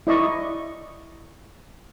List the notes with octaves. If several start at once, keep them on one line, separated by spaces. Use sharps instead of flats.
E4 D5 D#5 C#6